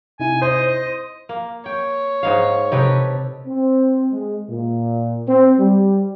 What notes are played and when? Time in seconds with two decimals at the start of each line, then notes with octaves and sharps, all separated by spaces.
0.20 C3 D#4 E4 G#5
0.42 C5 D#5
0.67 D#5
1.29 A#3
1.66 C#5 G5
2.23 G#2 D#4 F5
2.72 C3 D#4 G4 A4 B4
3.45 C4
4.13 G#3
4.49 A#2
5.29 C4
5.59 G3